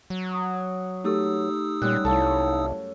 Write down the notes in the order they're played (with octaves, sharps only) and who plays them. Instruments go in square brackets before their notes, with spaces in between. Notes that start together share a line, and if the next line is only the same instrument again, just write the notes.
[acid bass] F#3
[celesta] D#6
[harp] A3 [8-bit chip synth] D#4 D#6 E6 [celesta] G4 A4
[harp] F#2 G3 [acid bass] A#2 [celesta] F#6
[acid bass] C2 [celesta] E4 F5 A5 [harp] A4 C#5